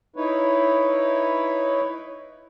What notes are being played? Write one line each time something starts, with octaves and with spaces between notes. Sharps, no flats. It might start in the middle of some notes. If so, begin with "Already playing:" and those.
D#4 E4 B4 C#5